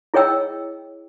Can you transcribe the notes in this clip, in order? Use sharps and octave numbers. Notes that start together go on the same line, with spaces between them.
E4 G#4 C#5 D#5 G5 E6